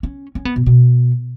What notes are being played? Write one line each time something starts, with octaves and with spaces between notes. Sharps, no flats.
C#4
C#4
B3
B2
B2